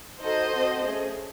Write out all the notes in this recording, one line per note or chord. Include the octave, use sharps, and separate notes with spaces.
D#4 F#4 A4 C5 D#5
C4 F#4 A4
A3 C#4 G#4